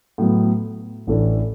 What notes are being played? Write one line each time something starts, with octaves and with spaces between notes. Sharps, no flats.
A2 F#3 B3
A1 A2 E3 A3 D4